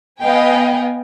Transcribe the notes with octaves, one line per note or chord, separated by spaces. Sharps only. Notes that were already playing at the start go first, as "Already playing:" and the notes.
B3 B4 D#5 F5 G5 G#5